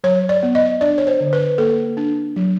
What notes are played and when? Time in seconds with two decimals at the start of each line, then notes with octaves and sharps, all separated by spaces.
0.04 F#3 C#5
0.29 D5
0.43 B3
0.55 D#5
0.81 D4 D5
0.98 C#5
1.07 C5
1.20 D3
1.33 B4
1.58 A#3 A4
1.97 D4
2.36 F#3